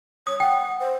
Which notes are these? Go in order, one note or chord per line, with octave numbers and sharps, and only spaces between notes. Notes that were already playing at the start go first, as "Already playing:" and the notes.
C#5 D#6
F#5 G5
C5